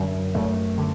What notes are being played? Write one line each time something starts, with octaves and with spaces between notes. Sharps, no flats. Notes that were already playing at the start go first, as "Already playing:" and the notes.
Already playing: F#2 D3
F#2 A3
D3